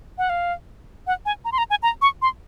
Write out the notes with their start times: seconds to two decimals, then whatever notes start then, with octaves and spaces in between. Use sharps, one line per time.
0.18 F#5
0.30 F5
1.07 F#5
1.26 G#5
1.45 A#5
1.52 C6
1.58 A#5
1.70 G#5
1.83 A#5
2.02 C#6
2.22 C6